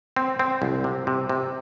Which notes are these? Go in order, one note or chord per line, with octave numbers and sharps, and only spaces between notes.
C4
C4
C2
C3
C3
C3